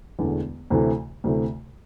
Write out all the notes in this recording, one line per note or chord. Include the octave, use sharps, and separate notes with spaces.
E1 E2 D3 A3
D2 C3 E3 A3
D2 C3 E3 A3